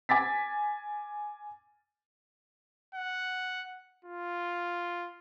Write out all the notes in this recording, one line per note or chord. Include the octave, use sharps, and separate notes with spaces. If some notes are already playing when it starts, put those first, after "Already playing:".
G#5 D6 A6 B6
F#5
F4